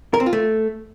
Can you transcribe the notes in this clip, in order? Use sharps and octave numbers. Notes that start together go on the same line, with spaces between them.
A#4
C4
F4
A3